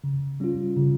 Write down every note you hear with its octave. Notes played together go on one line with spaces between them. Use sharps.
C#3
G3 C#4 F4
C#3